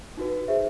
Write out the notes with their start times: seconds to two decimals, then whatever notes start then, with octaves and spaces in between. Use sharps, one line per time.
0.17 D#4 F#4 B4
0.48 G#4 C5 E5